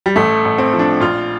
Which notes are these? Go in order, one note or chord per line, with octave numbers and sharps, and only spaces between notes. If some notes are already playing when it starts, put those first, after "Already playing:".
G3
A1 A3
A1
C4
F3
D4
A#1 F4